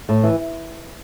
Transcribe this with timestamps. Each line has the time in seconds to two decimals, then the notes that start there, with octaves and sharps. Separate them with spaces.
0.09 A2
0.24 E3